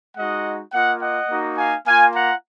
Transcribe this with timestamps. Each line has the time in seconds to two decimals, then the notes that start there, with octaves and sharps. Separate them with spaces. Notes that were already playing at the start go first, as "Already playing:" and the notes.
0.17 G#3 D#4 F#4 D#5 F#5
0.74 A#3 F4 D#5 F#5
1.02 D#5 F#5
1.30 A#3 D#4 F#4
1.58 F5 G#5
1.86 A#3 F4 F5 G#5
2.15 F#5 A#5